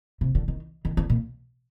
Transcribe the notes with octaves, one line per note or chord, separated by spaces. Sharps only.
C3
D3
D#3
D#3
D3
A#2